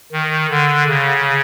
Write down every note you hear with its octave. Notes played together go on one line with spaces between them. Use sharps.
D#3
D3
C#3